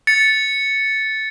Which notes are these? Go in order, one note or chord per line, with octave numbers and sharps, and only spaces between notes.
A6 C#7